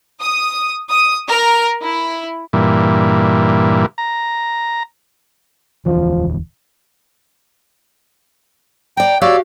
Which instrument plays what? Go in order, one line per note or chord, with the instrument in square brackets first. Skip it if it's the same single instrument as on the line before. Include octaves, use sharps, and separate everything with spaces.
[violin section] D#6
D#6
A#4
E4
[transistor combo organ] G2 A#2 E3
A#5
[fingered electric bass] E1 D2 E3 [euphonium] F3
[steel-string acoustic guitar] D5 A#5 [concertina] G5
[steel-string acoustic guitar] F#4 G4 F5 [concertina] C#5 D5 E6